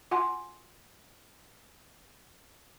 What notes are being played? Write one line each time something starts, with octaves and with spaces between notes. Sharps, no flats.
F4 F#5 G#5 C6